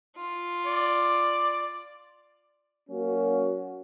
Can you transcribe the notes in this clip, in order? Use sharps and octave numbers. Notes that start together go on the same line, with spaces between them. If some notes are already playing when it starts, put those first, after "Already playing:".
F4
D5
F#3 A#3 C#4 F#4